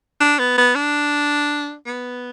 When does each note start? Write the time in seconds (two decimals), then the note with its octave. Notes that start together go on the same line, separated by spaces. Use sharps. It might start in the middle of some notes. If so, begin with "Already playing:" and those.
0.21 D4
0.39 B3
0.58 B3
0.75 D4
1.87 B3